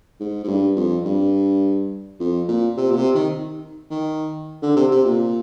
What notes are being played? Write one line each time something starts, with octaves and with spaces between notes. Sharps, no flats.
G#2
G#2
G2
F2
G2
F2
A#2
C3
A#2
C3
D#3
D#3
D3
C3
C3
A#2